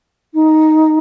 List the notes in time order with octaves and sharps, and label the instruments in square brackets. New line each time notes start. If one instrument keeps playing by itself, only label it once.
[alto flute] D#4